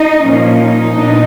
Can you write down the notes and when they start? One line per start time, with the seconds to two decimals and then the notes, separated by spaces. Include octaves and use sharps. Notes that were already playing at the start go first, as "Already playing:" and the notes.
Already playing: D#4
0.21 A#2 F3 A#3 C#4
0.56 D#4
0.92 A#2 F#3 B3 D4